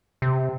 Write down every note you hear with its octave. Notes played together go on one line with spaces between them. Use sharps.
C3